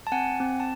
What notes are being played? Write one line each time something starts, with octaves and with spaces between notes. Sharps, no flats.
A5
C4 F#5 G#5
C4
A5